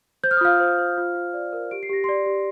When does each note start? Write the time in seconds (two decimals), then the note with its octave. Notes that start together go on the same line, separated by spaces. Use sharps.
0.24 C5 G6
0.31 F6
0.37 D#6
0.41 F4 F5 F6
0.60 C5
0.78 C5
0.97 F4
1.15 F4
1.34 D5
1.53 A#4
1.71 G4 D7
1.83 C7
1.90 G4 A#6
2.04 D5 C6 C7
2.26 G4